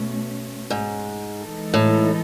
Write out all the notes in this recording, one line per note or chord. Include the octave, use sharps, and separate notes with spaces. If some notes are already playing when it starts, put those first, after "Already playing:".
Already playing: B2 A3 C#4
G#2
E3 G#3 D#4 A4
A2